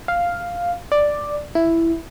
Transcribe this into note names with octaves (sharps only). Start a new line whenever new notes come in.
F5
D5
E4